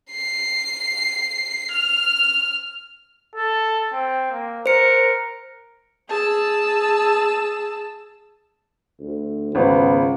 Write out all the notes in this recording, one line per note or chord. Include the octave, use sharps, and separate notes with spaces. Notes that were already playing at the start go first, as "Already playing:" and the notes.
C7
F6
A4
C4
A#3
A#4 C5 C#7
G#4 A5 E6
D2
G#1 C#2 B3